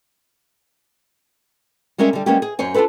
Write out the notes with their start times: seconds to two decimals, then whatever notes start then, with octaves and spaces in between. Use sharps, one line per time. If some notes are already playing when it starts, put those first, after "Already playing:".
1.98 G3 G#3 C#4 A#4 E5
2.13 D3 G3
2.26 G3 G#3 A#3 B3 C#4 G4
2.42 G#4
2.59 F#2 C5 C#5 G#5
2.74 D4 F4 F#4 A4 B4